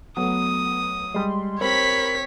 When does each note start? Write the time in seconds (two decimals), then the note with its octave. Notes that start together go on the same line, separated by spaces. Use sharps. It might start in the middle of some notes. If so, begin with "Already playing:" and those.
0.17 F#3 A3 B3 D#6
1.14 G3 G#3 C6
1.61 C4 G4 A#4 C#5 B5 B6